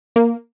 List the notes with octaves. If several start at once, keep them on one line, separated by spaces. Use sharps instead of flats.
A#3